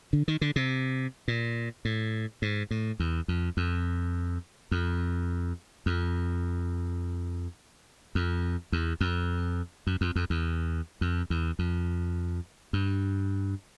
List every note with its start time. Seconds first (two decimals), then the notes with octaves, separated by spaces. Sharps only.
0.13 D3
0.28 D#3
0.41 D3
0.56 C3
1.28 A#2
1.85 A2
2.42 G#2
2.71 A2
3.00 E2
3.28 F2
3.57 F2
4.71 F2
5.86 F2
8.15 F2
8.72 E2
9.01 F2
9.87 F#2
10.01 F2
10.16 F2
10.30 E2
11.01 F2
11.30 E2
11.59 F2
12.73 G2